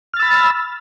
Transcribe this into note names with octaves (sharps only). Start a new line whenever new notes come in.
B5 E6 F6 A6